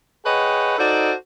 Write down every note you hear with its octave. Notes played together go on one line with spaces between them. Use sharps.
G#4 B4 C#5 D#5 F#5 G5
D#4 F#4 A4 C5 D5